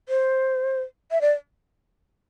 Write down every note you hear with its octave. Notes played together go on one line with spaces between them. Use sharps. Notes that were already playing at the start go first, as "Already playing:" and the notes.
C5
E5
D5